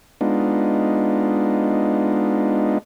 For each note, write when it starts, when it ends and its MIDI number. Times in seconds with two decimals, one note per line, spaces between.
0.21 2.78 56
0.21 2.78 59
0.21 2.78 62
0.21 2.78 63
0.21 2.78 65